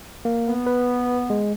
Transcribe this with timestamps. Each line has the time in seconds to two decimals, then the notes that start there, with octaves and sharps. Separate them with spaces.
0.25 A#3
0.48 B3
0.67 B4
1.30 G#3